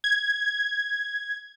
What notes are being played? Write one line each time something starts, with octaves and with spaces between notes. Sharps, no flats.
G#6